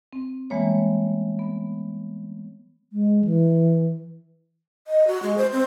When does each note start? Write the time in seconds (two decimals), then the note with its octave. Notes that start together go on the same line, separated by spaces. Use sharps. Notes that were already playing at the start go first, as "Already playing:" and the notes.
0.13 C4
0.50 E3 G3 G#3 A#3 B3 C#5
1.39 B3
2.93 G#3
3.25 E3
4.87 D#5
5.07 F#4
5.23 G#3
5.38 C5
5.52 C4